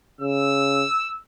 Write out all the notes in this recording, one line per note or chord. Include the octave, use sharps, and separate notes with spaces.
C#3 E6